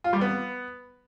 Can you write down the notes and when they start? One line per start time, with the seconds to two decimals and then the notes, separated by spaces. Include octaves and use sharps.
0.04 F4
0.13 G3
0.21 B3